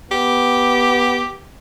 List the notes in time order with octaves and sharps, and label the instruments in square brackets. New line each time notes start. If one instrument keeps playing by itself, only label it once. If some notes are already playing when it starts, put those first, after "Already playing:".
[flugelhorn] B3 [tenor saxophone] G4